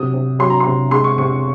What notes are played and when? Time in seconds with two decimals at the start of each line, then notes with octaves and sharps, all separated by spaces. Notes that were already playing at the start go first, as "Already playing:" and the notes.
Already playing: C3 F#3 D#6
0.13 C3
0.39 F#3 C6
0.50 A#5
0.60 C6
0.65 C3
0.91 G#3 C6
1.04 C#6
1.18 C3 C#6